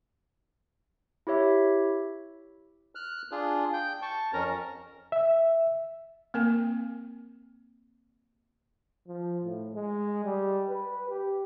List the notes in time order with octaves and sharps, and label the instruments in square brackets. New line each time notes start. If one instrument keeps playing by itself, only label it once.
[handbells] E4 G4 C#5 E5
[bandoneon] F6 F#6
D4 F4 G#4
G5 G6
A5 C#6
F2 C#4 A#4 A#5
[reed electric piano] E5
[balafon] A#3 C4 A#4 G#5
[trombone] F3
A2
G#3
G3
B4
G4